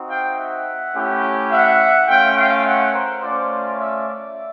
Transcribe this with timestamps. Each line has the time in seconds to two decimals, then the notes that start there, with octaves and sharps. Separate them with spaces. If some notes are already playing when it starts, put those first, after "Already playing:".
Already playing: C4 D#4 F#4
0.08 F5 G5
0.37 E5 F#5
0.94 A3 C#4 E4 G4
1.51 E5 F#5
2.08 A3 C#4 F4 F5 G5
2.37 F5 G5
2.65 E5 F#5
2.93 A#4 C5
3.22 A3 C#4 F4 C5 D5
3.79 D5 E5
4.08 D5 E5